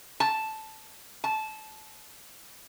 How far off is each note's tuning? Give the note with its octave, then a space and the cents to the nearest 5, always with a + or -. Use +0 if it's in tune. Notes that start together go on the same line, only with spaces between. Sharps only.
A5 -5
A5 -20